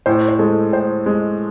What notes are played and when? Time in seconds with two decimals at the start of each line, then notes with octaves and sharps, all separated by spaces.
0.06 A2 C5
0.28 C5
0.39 G#3 A4
0.72 A2 C5
1.06 G#3